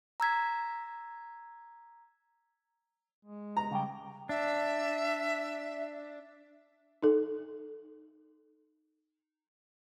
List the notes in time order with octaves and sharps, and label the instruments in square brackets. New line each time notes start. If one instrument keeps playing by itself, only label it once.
[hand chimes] A#5 E6 G#6 B6
[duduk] G#3
[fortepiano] A#5
[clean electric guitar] C#3 G3 G5
[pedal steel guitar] D4 [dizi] E5
[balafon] D#4 A4